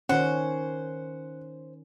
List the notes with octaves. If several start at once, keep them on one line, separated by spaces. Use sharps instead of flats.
D#3 C#4 C5 F#5